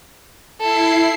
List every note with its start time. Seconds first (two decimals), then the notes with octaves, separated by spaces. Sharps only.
0.60 E4 A4 C7